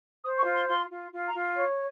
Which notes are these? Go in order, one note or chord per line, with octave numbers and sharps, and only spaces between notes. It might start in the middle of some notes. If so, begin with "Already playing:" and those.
C5 D#6
C#6
F4
C6
F4 C6
F4
F4
A#5
F4
C#5